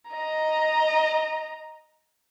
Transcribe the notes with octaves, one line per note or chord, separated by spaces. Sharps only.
D#5 A#5